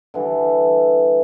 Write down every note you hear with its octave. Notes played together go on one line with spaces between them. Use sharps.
D3 E3 G3